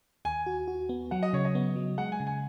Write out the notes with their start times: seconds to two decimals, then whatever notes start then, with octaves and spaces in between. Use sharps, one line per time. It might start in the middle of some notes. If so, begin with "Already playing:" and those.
0.25 D#2 G#5
0.46 F#4
0.68 F#4
0.89 B3
1.11 F#3 F#5
1.23 D#5
1.33 C#3 C#5
1.45 D#5
1.55 B3
1.76 F#3
1.98 G#3 F#5
2.12 G#5
2.20 C#3
2.27 G#5